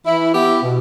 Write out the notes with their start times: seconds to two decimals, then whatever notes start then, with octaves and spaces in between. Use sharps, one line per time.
0.06 E3 E4
0.33 B3 E4 G4
0.62 B2